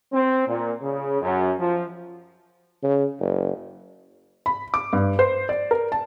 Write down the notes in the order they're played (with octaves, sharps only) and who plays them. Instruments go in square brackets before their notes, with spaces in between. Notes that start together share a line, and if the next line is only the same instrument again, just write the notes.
[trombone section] C4
A#2
C#3
F#2
F3
[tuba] C#3
F#1
[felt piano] B5
D6
G2
C5
D5
A#4
A5